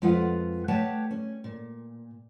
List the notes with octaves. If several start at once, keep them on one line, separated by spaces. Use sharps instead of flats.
F2 G#3 F4 B4 F5 F#5
A3 G4 B4 C#5 F#5 A5
C#4
A#2